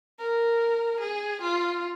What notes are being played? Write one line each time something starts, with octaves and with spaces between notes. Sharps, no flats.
A#4
G#4
F4